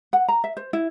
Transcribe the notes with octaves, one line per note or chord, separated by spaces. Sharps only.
F#5
A#5
E5
C5
E4